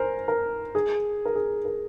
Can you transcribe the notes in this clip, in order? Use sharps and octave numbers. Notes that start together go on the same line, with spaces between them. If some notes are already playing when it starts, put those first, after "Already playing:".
Already playing: A#4 C5 G#5
A#4
G#4
A#4
G#4
A#4